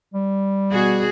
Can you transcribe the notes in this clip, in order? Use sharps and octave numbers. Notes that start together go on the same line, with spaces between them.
G3
B2 F#4 G#4